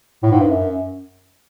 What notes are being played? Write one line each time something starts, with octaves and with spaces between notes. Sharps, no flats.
A2
G#2
G2
F#2